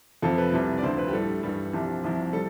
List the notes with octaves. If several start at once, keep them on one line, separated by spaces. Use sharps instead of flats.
F2 C3 F3 A4
B4
C2 C3 G3
D5
D2 D3 F3 C5
B4
G4
A2 G3 A4
G2 E3 G3
C2 C3 F3 G4
C2 C3 F3
G3 A4